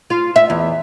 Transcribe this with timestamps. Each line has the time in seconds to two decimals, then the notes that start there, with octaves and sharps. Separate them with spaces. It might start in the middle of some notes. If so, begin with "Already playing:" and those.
0.10 F4
0.36 E5
0.50 E2